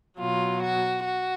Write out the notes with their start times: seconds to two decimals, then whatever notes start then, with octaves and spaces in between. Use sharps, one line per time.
0.19 B2 F#3 F4
0.61 F#4
1.05 F#4